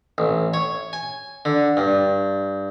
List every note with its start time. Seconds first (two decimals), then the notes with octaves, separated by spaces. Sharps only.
0.18 A1
0.54 C#5
0.93 G#5
1.45 D3
1.77 G2